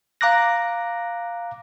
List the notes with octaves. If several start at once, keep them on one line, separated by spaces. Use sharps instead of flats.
F5 A#5 D6 F#6 A#6